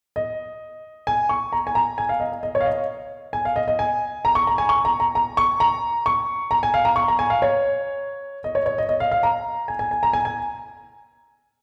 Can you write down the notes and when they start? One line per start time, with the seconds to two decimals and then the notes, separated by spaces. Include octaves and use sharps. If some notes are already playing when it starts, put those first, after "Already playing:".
0.16 D#5
1.07 G#5
1.29 C#6
1.53 A#5
1.67 G#5
1.75 A#5
1.98 G#5
2.09 F5
2.20 D#5
2.32 D#5
2.43 D#5
2.55 C#5
2.61 F5
2.66 D#5
3.33 G#5
3.45 F5
3.56 D#5
3.68 D#5
3.79 G#5
4.25 A#5
4.35 C#6
4.47 A#5
4.58 G#5
4.69 C#6
4.85 A#5
5.00 A#5
5.15 A#5
5.37 C#6
5.60 A#5
6.06 C#6
6.51 A#5
6.63 G#5
6.74 F5
6.85 A#5
6.96 C#6
7.08 A#5
7.19 G#5
7.30 F5
7.42 C#5
8.44 D#5
8.55 C#5
8.66 C#5
8.78 D#5
8.89 D#5
9.00 F5
9.12 F5
9.23 A#5
9.68 G#5
9.79 G#5
9.91 G#5
10.03 A#5
10.13 G#5
10.25 G#5